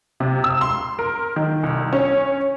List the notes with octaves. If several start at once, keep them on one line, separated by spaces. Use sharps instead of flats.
C3
E6
C6
A#4
D#3
C2
C#4